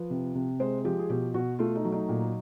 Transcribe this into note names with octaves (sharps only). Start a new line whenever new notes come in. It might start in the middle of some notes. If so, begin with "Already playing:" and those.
Already playing: F3 B4
C3
C3
G#3 C5
F3 G4
G#4
B2 G4
B2 F#4
A3 F4
D#4
F#3
D#4
A#2